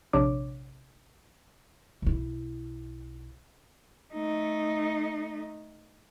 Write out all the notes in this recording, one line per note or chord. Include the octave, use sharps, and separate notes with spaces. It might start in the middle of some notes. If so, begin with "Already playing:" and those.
A#1 C3 D4 C#5 D6
B1 E4
A3 D#4